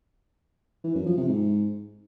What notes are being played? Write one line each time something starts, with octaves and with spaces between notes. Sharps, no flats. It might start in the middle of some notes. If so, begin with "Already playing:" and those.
E3
F#2
F3
C3
G#2